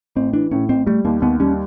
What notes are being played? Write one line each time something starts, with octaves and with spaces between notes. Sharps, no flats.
A1 C4
E3 D4
A2 C#4
A1 C4
G3 A3
D#2 A#3
D#2 B3
G3 C#4